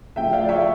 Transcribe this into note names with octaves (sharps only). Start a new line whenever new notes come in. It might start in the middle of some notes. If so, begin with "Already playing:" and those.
C#3 F3 A3 E5 G5
D5 F5
D5
C#5 E5